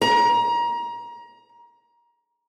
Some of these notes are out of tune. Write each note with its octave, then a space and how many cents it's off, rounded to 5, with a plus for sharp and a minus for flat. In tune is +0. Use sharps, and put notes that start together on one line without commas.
A#5 +25